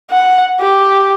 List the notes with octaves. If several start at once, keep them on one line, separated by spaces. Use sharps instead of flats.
F#5
G4